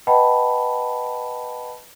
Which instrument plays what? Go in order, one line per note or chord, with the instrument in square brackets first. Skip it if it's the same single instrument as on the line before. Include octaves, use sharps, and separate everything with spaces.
[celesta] B4 D#5 F#5 G5 A5 B5